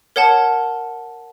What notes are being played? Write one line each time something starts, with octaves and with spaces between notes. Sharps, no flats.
A#4 C#5 F#5 A5